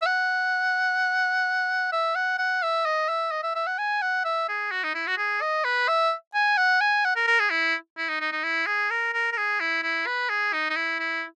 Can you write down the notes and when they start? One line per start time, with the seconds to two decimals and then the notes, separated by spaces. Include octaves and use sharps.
0.02 E5
0.06 F#5
1.92 E5
2.15 F#5
2.38 F#5
2.62 E5
2.86 D#5
3.09 E5
3.32 D#5
3.43 E5
3.55 E5
3.67 F#5
3.78 G#5
4.02 F#5
4.24 E5
4.48 G#4
4.71 F#4
4.83 D#4
4.95 E4
5.07 F#4
5.18 G#4
5.41 D#5
5.64 B4
5.88 E5
6.34 G#5
6.57 F#5
6.81 G#5
7.05 F#5
7.16 A#4
7.27 A#4
7.39 G#4
7.50 E4
7.97 E4
8.09 D#4
8.20 D#4
8.32 D#4
8.44 E4
8.66 G#4
8.90 A#4
9.13 A#4
9.32 A#4
9.37 G#4
9.60 E4
9.83 E4
10.06 B4
10.29 G#4
10.53 D#4
10.70 D#4
10.76 E4
11.00 E4